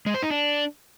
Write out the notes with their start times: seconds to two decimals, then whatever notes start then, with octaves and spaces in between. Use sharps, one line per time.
0.06 G#3
0.14 C5
0.22 D#4
0.30 D4